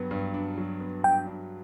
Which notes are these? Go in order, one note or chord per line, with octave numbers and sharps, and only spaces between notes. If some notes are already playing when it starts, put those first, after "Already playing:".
Already playing: G2 F#3 B3
G2
D4
F#3
B3
G2 G5
D4